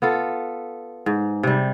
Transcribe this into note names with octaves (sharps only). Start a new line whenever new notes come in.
B3 F4 A4
G#2
C3 G3